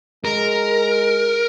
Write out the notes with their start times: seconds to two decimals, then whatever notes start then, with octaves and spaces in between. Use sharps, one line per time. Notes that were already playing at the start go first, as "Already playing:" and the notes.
0.25 G#3 A#4